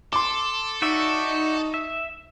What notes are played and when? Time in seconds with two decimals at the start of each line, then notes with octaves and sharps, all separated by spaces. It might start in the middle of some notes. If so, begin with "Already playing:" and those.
0.13 A4 C6 D6
0.82 D#4 F#4 D5 E5
1.74 E5